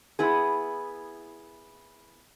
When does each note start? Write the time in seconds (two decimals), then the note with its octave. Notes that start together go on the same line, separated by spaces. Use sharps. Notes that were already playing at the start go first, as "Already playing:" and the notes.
0.19 B3 E4 G#4